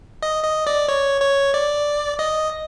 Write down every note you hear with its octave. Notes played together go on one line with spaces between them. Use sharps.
D#5
D#5
D5
C#5
C#5
D5
D#5